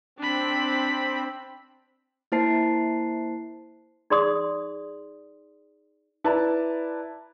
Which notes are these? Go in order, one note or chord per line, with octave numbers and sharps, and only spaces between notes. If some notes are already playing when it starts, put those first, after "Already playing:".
C4 D4 B5
A#3 E4 C5 A5 C7
D#4 G#4 D5 C6 D#6
E4 B4 D5 E5 A5 A#5